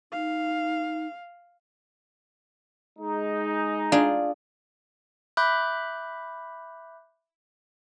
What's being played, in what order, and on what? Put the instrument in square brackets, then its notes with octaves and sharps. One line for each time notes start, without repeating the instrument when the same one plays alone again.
[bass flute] D#4 [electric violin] F5
[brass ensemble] G#3 D#4
[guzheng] D4 F4 G#4
[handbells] E5 B5 D6 F#6 G6